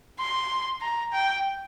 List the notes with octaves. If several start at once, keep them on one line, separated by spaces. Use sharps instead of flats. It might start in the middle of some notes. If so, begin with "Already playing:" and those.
C6
A#5
G5